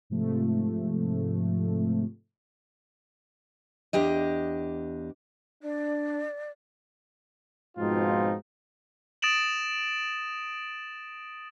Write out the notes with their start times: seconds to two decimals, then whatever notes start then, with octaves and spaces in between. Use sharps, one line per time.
0.10 G#2 C3 F3 A3
3.93 E2 D4 G4 D#5
5.63 D4 D5
7.78 G#2 B2 F3 C4 D#4 F4
9.22 D#6 A6 A#6 D7 E7 F#7